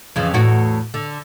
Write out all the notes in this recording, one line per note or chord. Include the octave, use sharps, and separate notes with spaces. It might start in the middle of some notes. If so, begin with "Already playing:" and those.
F2 C#3 E3
E2 A2 F#4
D3